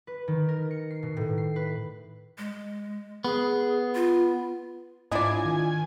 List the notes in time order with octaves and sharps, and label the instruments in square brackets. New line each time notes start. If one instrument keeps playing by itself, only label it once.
[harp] B4
D#3
A#4
C#7
C7
B2
A2
C7
B4
[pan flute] G#3
[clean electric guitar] B3 [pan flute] G#4
[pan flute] F4
[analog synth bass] G#2 [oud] D4 E4 F4 [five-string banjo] D5 D#5 [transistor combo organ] G#5
[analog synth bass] D#3